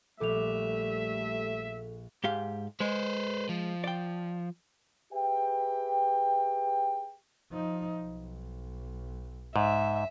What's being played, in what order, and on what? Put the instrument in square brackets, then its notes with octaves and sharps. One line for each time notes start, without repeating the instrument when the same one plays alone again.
[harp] A#1 D6 [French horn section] G3 A3 [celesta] A4 F7 [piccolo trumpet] E5
[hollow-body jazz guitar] G#2 G4 F5
[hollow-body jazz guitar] G#3 [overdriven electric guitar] B4 C5
[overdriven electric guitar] F3
[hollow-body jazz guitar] D5 G5
[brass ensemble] G4 G#4 B4 E5 G5
[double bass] F3 D#4
B1
[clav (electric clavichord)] G#2 [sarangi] E5